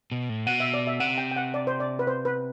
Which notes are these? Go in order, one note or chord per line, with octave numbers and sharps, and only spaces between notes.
B2
A2
B2 F#5
E5
D5
E5
C3 F#5
G5
G5
F#5
D5
C5
D5
B4
C5
B4